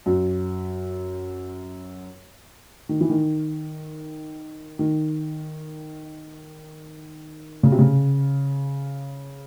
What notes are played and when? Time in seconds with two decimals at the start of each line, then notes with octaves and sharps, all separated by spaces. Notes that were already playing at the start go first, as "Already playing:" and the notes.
0.06 F#2
2.89 D#3
3.01 E3
3.10 D#3
4.79 D#3
7.63 C#3
7.72 C3
7.79 C#3